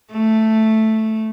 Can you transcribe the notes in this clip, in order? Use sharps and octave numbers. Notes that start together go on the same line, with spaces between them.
A3